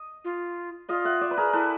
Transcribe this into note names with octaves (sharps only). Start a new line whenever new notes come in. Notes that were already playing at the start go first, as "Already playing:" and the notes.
Already playing: D#5
F4
F4 D#5 F5
E5 F#5
D5 E5
B4
G#4 A#4
E4 A4 B4